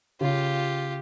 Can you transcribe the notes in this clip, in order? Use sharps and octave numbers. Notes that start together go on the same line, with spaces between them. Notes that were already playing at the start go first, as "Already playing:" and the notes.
C#3 F4 G4